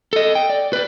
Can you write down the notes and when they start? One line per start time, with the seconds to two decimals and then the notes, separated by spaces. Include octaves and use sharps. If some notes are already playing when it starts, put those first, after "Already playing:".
0.13 A4 D#5
0.35 G5
0.50 D5
0.73 B4 D5